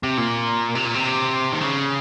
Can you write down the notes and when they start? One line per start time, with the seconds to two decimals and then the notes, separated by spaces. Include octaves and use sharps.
0.03 C3
0.17 A#2
0.75 C3
0.85 A#2
0.94 C3
1.52 D#3
1.61 C#3